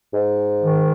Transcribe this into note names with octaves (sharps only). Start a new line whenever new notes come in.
G#2
D#3